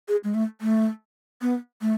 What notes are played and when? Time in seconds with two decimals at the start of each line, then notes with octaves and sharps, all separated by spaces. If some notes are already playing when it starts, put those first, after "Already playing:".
0.08 G#4
0.24 G#3
0.34 A3
0.61 A3
1.42 B3
1.81 A3